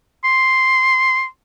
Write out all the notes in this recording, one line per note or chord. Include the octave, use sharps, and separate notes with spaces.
C6